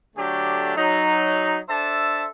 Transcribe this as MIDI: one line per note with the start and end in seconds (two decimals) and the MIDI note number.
0.16 0.74 50
0.16 0.74 54
0.16 0.74 57
0.16 0.74 62
0.16 0.74 67
0.77 1.58 54
0.77 1.58 63
1.69 2.26 62
1.69 2.26 69
1.69 2.26 72
1.69 2.26 76
1.69 2.26 81